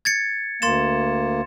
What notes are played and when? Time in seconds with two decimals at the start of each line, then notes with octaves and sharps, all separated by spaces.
0.05 G#6 A6 C#7
0.62 D2 A#3 C6 A6 E7